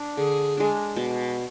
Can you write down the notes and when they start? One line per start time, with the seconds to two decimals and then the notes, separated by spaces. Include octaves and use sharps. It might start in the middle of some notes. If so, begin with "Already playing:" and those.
Already playing: D4
0.17 D3 G#4
0.57 G#3 D4
0.96 B2